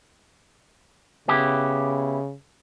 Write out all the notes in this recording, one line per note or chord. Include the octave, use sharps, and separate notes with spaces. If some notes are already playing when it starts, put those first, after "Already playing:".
C#3 B3 E4 G4